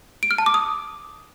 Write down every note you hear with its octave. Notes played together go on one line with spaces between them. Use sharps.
D7
F6
A5
D6
D#6